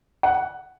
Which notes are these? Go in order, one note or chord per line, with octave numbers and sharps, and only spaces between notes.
F#5